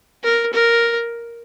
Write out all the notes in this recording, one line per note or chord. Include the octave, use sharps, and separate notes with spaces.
A#4
A#4